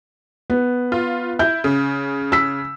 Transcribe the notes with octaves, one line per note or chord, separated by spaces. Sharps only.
B3
F4
E4 G6
C#3
E6 B6